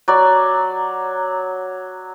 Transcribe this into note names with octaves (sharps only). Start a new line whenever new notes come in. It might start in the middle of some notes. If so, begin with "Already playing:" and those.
F#3 D5